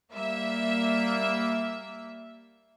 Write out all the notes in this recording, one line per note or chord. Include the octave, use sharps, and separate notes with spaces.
G3 A#3 E5